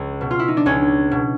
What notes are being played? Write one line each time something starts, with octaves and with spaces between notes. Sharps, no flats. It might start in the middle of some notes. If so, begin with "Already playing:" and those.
Already playing: C#2
B2
F4
E4
D#4
D4
C#2 C#4
B2